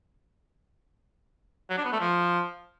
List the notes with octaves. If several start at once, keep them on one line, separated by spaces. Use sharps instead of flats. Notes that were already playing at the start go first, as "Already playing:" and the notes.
F#3
D4
B3
A3
F3